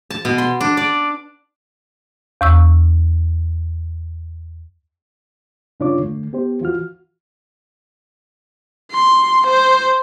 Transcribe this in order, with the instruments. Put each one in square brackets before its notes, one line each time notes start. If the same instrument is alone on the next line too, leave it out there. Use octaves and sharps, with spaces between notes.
[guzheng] A5
B2
C6
D4
D5
[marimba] E2 C#6 E6
[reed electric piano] G2 C#3 D4 F4 C#5 D6
D3 A3
B3 G4 C5
E3 F4 F#4 F6
[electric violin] C6
C5